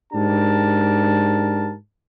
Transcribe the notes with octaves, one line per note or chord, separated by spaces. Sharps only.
G#2 D4 G4 A#4 A5